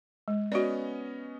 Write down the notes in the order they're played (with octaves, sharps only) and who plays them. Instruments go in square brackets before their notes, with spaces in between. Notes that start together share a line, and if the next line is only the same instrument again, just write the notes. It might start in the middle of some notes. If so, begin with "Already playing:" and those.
[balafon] G#3
[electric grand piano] B3 C#4 D#5 [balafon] F#4 D5